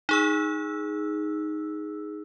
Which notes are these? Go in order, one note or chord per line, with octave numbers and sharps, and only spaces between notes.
D#4 G#4 E6